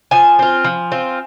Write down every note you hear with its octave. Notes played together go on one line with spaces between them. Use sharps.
F3 G#5
C4 F4
F3
C4 F4